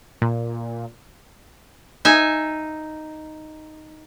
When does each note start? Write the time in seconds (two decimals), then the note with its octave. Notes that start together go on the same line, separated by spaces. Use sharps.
0.22 A#2
2.05 D#4 E5 G#5